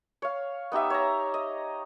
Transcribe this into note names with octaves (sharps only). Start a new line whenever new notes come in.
C#5 F5
B3 D#4 G4 E5
C#5 A#5
D#5